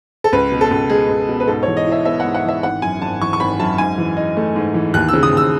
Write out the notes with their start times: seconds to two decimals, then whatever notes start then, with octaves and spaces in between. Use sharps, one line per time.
0.24 A4
0.33 C#2 B4
0.51 B2
0.61 A4
0.71 C#2
0.90 G#3 G#4
1.09 C#2
1.28 B2
1.40 B4
1.48 G#2 A4
1.63 E3 C#5
1.77 D#5
1.87 E4
1.92 E5
2.05 B3 E5
2.20 G#2 F#5
2.35 F#5
2.45 E3 E5
2.63 G#1 F#5
2.82 F#2 G#5
3.02 G#1 A5
3.21 E3 C#6
3.33 C#6
3.40 G#1 B5
3.59 F#2 A5
3.78 G#2 G#5
3.98 E3
4.17 D#4
4.37 A3
4.56 G#2
4.74 E3
4.94 D#2 F#6
5.09 C#3 E6
5.23 D#6
5.32 D#2 E6